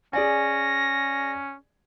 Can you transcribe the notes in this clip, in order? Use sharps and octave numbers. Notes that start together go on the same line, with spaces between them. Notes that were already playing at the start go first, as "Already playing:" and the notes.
C#4 G#4 D5 G#5 A#6